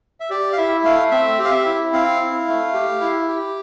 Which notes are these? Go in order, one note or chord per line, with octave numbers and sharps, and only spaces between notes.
E5
G4 D5
F5
E4 E5
A3 F5
C4 E5
G4
F5
E5
E4
C4 F5
E4
A3
G4
E4
G4